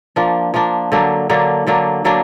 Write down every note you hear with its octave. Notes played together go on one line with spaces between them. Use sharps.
F3 A#3 D4
F3 A#3 D4
D3 F#3 A#3 D4
D3 F#3 A#3 D4
D3 F#3 A#3 D4
D3 F#3 A#3 D4